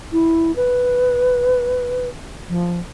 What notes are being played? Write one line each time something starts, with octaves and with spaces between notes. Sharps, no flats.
E4
B4
F3